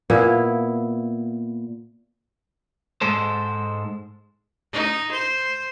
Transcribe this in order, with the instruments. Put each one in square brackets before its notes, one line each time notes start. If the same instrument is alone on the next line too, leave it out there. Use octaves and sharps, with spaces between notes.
[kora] A#2 B3 E4 F5
[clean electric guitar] G#2 G#3 A4 C5
[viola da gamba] D#4
C5